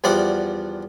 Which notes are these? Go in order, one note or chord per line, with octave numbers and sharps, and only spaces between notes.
E2 F3 G3 D5 F#5